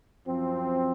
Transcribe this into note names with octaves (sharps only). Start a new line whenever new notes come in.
F#2 F3 C4